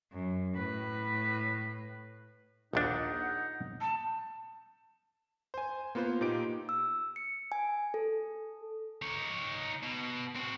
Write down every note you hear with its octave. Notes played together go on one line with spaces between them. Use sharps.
F#2
A2 B4
A#1 D#2 D4 D#4 F#5
A5
C5 G#5
A#3 B3 F4 B4 C5
A#2 D#4 G4 D7
E6
C#7
G#5
A4
D#4 C#5
B2
C4 F#4